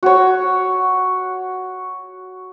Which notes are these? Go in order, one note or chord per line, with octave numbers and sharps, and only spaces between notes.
F#4 C#5